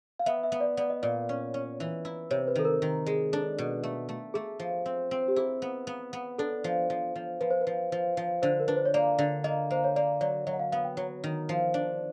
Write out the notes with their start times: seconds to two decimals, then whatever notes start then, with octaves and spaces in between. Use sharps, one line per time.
0.19 F5
0.26 B3 E5
0.43 E5
0.52 B3
0.60 D5
0.77 B3 D5
0.90 D#5
1.02 A#2 D5
1.29 C#4
1.54 C#4
1.80 E3
2.05 E4
2.31 C3 C#5
2.48 B4
2.55 D#3 A4
2.65 A#4
2.82 D#3
3.06 G#3
3.32 D4 A4
3.58 B2
3.83 A3
4.09 A3
4.34 A3 G#4
4.60 F3
4.86 C4
5.11 C4
5.28 G4
5.36 E4 G#4
5.62 B3
5.87 B3
6.13 B3
6.38 D4 A4
6.64 F3
6.90 F3
7.15 F3
7.41 F3 B4
7.51 C5
7.61 B4
7.67 F3
7.92 F3
8.17 F3
8.42 D3 C5
8.60 A#4
8.68 D4 B4
8.76 C5
8.85 C#5
8.94 A#3 D5
9.19 D3
9.44 A#3 D#5
9.70 A#3 C5
9.84 C#5
9.96 A#3 D5
10.21 F#3 D5
10.47 F#3 D#5
10.54 F#5
10.60 F5
10.72 B3 F5
10.84 G5
10.97 F#3
11.24 D#3
11.49 F3
11.74 D4